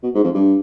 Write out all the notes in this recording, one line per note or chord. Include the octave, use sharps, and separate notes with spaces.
B2
G#2
F2
G2